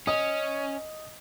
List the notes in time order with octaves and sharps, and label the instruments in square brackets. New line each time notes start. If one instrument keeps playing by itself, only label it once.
[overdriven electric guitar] C#4 [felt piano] D#5 D#6